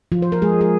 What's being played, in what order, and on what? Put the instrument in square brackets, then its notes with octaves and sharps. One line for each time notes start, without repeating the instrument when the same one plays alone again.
[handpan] F3 F4
C5
A#4
G#3 G#4
G#4